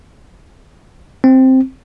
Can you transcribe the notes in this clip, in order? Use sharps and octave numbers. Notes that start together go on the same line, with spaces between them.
C4